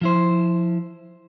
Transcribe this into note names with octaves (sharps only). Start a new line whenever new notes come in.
F3 E4 C5